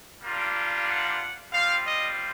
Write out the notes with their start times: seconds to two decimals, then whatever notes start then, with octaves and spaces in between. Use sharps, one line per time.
0.23 G3 A#3 D4 F4
0.88 F#5
1.53 G3 C4 F4 F5
1.85 D#5